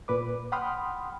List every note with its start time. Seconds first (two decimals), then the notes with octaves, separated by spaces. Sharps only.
0.08 A#2 B4 D6
0.52 F#5 G5 B5 C6 D#6 F6